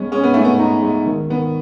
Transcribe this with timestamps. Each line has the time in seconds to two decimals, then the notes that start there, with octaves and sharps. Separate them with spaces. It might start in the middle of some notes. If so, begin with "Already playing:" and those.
Already playing: G#3 B3 C#4
0.12 C#4 G#4
0.24 B3
0.34 A3 D#4
0.45 B3
0.59 D#4
0.83 G#3
1.07 D#3
1.30 D#3 B3